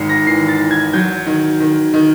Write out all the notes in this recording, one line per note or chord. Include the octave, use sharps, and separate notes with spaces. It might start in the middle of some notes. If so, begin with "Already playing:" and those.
Already playing: G#1 G#2 C7 C#7
A#6
E3 C7
A6
E3
G#6
F#3 G6
D#3
D#3
D#3